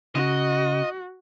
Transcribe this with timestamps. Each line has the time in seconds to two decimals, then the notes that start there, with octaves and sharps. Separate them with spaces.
0.15 C#3 F#4 D#5